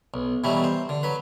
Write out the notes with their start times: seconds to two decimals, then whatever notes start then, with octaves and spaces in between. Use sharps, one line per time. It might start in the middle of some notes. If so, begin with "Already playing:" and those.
0.14 B1
0.44 B2 E3 F#3 G3 A3
0.64 C5
0.89 D3
1.03 F#3 B4